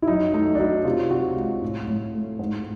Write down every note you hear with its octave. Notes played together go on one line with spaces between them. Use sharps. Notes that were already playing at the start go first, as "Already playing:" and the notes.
E4
F#2 D#4
A3 D#4
D4
F#3 D#4
C3 F4
C3 F#4
G#3 F4
A2
A2
A3
G#2